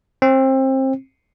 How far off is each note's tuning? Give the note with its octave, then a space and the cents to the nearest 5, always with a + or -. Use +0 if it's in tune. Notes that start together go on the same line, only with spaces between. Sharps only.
C4 +25